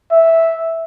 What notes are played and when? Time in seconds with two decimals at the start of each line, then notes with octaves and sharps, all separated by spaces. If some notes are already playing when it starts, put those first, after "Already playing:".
0.11 E5